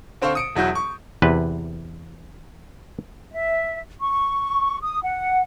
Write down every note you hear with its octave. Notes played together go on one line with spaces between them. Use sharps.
D3 C4 C5 F5 C#6
D#6 C#7 D7
E1 F#3 E4 F#4 G6
C#6
E2 C3 B4
E5
C#6
D#6
F#5